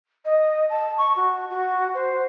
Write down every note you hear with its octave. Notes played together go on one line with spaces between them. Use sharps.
D#5
A5
C#6
F#4
F#4
C5